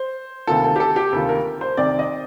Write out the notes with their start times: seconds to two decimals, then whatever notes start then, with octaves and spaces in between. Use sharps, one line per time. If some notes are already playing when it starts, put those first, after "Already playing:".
Already playing: C5
0.47 D2 C3 D#3 A#3 F4 A4
0.64 A4
0.76 G4
0.80 A4
0.96 G4
1.12 D2 C3 D#3 A#3 F4 A4
1.29 A#4
1.61 C5
1.77 C2 C3 D#3 D5
1.99 D#5